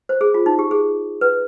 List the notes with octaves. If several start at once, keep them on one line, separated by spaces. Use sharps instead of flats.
C5
G#4
F4
D#4
G4
G#4
B4